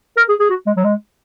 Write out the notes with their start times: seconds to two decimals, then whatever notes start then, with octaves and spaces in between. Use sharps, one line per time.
0.17 A#4
0.29 G#4
0.40 G#4
0.50 F#4
0.67 G#3
0.77 F#3
0.84 G#3